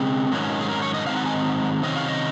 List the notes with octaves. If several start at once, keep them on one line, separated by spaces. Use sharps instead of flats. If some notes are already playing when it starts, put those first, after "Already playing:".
Already playing: C#3 G#3 C4
G#2 D#3 F#3 C#4
G#4
A#4
C#5
D#5
G#2 D#3 F#3 C4 D#4 F5
F#5
G#5
C3 D#3 F#3 C#4 D#5
F5
D#5